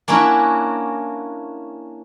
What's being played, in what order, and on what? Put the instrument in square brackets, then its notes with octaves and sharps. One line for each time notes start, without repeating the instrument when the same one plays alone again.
[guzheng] A#3 C#4 D4 E4 F#4